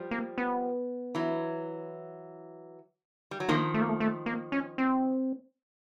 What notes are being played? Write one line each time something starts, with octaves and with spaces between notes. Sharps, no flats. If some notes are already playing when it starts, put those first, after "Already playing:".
Already playing: F3 G3
A#3
B3
E3 F#3
G3
F#3
D#3 F3 A#3
A3
A#3
A3
A3
A#3
C#4
C4